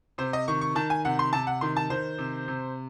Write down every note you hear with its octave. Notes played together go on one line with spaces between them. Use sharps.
C3 C5
D#5
D#3 C#6
C#6
D#3 A5
G#5
C3 F#5
C6
C3 A5
F#5
D#3 C6
A5
D#3 C5
C3
C3